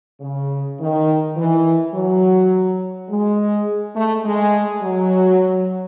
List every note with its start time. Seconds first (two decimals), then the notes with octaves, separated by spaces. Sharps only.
0.21 C#3
0.79 D#3
1.36 E3
1.94 F#3
3.09 G#3
3.95 A3
4.24 G#3
4.81 F#3